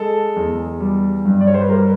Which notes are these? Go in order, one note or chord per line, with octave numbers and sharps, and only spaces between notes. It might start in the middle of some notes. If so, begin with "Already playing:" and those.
Already playing: G#3 A4
E2
G3
G2
D5
C#5
C5
B4
G3 A#4